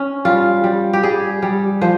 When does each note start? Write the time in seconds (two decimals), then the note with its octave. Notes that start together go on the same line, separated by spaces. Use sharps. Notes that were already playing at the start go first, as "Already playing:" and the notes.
Already playing: C#4
0.25 G3 F4
0.64 G3
0.93 G4
1.03 G3 G#4
1.42 G3
1.81 F3 C5